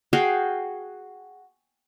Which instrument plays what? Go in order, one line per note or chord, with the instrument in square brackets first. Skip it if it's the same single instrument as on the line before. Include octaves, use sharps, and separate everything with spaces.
[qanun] F#4 G#4 F5 G5